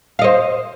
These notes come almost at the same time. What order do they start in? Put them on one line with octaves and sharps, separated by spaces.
F5 D#5 C5